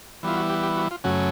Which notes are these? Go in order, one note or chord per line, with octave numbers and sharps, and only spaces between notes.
E3 G3 B3 E4 F4
F#4
G4
G4
F#4
F4
F#2 C#3 F#3 A3 C#4 F#4